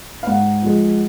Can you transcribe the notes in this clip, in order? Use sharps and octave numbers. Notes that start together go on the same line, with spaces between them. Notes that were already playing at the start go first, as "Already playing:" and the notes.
F5
G#2 F#5
F3 G#3